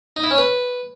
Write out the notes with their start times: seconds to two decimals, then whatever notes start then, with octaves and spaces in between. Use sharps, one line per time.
0.16 D#4
0.24 E4
0.31 C#4
0.38 B4